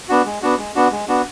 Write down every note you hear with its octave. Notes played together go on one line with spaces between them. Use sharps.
B3 D4 F#4
G#3
B3 D4 F#4
G#3
B3 D4 F#4
G#3
B3 D4 F#4